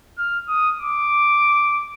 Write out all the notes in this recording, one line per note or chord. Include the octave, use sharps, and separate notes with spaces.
F6
D#6
D6